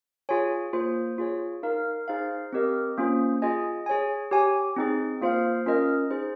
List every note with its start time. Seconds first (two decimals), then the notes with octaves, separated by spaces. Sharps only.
0.29 F4 G#4 C#5 G#5
0.73 A#3 F4 C5
1.18 F4 G#4 C#5
1.63 D#4 A#4 F5
2.08 D#4 G#4 C5 F5
2.53 C4 G4 A#4 D#5
2.98 A#3 C#4 F4 C5
3.42 F4 G#4 D#5 G#5
3.86 G#4 C#5 G#5
4.31 G4 C#5 G#5
4.76 C4 D#4 G#4
5.21 A#3 F4 C5 F5
5.66 C#4 F4 A#4 D#5
6.11 D#4 G#4 C5